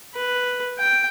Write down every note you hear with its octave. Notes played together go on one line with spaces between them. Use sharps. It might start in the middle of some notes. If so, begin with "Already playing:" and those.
B4
G5